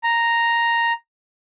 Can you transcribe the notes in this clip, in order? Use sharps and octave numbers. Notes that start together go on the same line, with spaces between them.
A#5